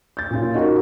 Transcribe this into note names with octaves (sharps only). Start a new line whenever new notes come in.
G6 A6
A#2 C#4 F4
D#4 F4 F#4 A#4